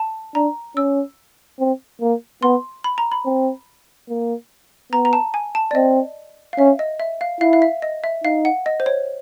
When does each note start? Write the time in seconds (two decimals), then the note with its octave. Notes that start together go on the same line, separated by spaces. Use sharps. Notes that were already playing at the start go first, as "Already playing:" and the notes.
Already playing: A5
0.35 D4 A#5
0.76 C#4 E6
1.60 C4
2.01 A#3
2.43 B3 C6
2.84 B5
2.98 A#5
3.12 B5
3.26 C4
4.09 A#3
4.92 B3 A#5
5.05 A#5
5.13 A5
5.34 G#5
5.55 A5
5.71 D5
5.75 C4 D#5
6.53 F5
6.58 C#4 E5
6.79 D#5
7.00 E5
7.21 F5
7.41 E4 F5
7.53 F5
7.62 E5
7.82 D#5
8.04 E5
8.24 D#4 F5
8.45 F#5
8.66 D#5
8.80 C5
8.86 C#5